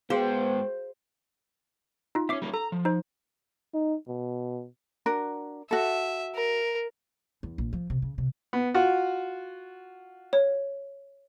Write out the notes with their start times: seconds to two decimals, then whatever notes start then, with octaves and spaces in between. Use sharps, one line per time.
0.10 G#2 B3 F#4 G#4 C5 F5 G5
2.15 D#4 F4
2.29 C4 C#4 E5 D6 C7
2.42 G3 A#3 C#4
2.54 A4 A#5
2.72 F3
2.85 D#4 C5
3.74 D#4
4.08 B2
5.06 D4 F#4 A#4
5.71 F#4 A4 E5
6.35 A#4
7.43 E2
7.58 A#1
7.73 F3
7.90 C3
8.02 C#3
8.18 C3
8.53 B3
8.74 F4 F#4 F#5
10.33 C#5